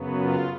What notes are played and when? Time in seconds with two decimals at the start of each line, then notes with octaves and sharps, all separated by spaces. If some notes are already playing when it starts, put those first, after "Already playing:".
Already playing: F#2 C#3 F#3 B3
0.16 F4